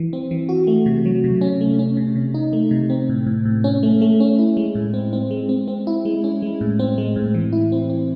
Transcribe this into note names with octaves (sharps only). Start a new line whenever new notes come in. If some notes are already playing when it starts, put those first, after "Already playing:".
Already playing: E3
C4
E3
F#4
A3
C3
F#3
C3
C#4
A3
C#4
C3
C3
D#4
A3
C3
C4
A2
A2
A2
C#4
A3
A3
C#4
E4
G#3
A2
C4
C4
G#3
C4
C4
E4
G#3
C#4
G#3
A2
C4
G#3
A2
E3
E4
C4
C4